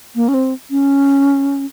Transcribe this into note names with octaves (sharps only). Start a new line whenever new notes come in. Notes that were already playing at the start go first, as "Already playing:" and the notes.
A#3
C#4
C4
C#4